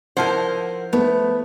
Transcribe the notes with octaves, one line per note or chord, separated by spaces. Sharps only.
F3 E4 A#4 C5 F#5
A3 B3